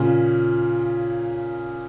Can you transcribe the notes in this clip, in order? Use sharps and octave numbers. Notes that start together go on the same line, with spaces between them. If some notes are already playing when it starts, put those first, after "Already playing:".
Already playing: A#2 C#3